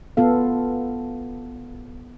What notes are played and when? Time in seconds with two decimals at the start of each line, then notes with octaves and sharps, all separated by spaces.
0.17 B3 F4 A4 F5